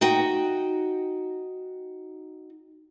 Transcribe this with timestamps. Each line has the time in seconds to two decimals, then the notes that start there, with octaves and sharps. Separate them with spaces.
0.01 D#4 F#4 G5